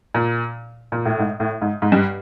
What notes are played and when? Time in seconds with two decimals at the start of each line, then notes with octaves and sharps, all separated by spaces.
0.14 A#2
0.92 A#2
1.05 A2
1.19 G#2
1.40 A2
1.62 G#2
1.82 G#2
1.92 G2